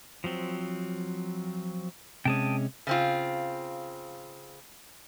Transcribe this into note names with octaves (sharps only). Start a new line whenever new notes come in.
F3 F#3 C4
C3 G#3 C#4 G5 A5 D#6
C#3 C4 F4